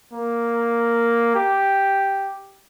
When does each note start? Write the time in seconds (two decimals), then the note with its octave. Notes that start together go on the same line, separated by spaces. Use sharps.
0.14 A#3
1.36 G4